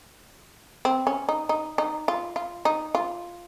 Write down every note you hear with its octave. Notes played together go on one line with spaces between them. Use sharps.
C4
C#4
D#4
D#4
D#4
F4
F4
D#4
F4